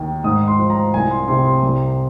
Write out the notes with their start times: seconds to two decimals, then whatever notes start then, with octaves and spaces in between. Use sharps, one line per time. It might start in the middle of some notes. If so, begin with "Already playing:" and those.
Already playing: D#2 D#3
0.24 G#2 D#6
0.48 C6
0.59 F3
0.70 A#5
0.94 C2 G#5
1.11 C6
1.28 C3 C6
1.45 C6
1.63 C2